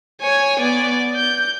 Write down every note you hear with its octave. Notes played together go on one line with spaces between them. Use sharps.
C#5 G#5
B3 D5
G6